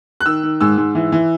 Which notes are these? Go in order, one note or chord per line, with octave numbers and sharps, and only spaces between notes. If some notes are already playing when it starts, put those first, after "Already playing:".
F#6
D#3 E6
D#3
G#2 E6
G#2
E3
E3